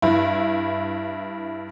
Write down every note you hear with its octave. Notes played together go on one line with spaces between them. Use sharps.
G2 E4